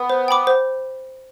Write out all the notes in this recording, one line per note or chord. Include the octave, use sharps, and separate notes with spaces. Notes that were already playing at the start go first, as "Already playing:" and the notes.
Already playing: B3
C5
G5 B5 D6
C5